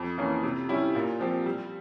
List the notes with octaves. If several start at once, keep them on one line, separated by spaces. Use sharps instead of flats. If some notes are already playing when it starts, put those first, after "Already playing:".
Already playing: F2
E3 A#3 C#4
C3
G3 C#4 E4 G4
A#2
F3 C4 G4
G3